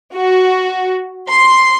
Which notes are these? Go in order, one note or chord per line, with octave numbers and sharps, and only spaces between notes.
F#4
C6